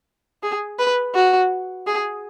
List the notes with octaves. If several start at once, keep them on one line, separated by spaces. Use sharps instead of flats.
G#4
B4
F#4
G#4